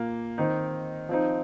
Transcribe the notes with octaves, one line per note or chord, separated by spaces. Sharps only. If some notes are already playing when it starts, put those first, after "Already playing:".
Already playing: A#2 A#3 F4
D#3 C4 D#4
F3 C4 D#4